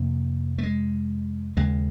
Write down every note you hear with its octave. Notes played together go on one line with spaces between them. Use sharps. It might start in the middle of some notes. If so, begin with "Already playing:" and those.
Already playing: F2 C3 A#3
A3
G#3
D#2 C#3 G#3